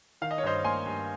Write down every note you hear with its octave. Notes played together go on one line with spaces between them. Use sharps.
D#3 F5
D#5
C#5
G2 C5 D#5
A#3 G#5 C6
G2